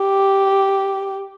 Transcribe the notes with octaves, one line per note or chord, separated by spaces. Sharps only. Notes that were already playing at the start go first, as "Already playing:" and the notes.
Already playing: G4